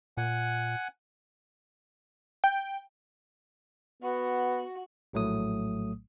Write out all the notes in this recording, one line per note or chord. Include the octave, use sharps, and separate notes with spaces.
A#2 F#5 G#5
G5
B3 F#4
A#1 A2 F#3 A3 D#6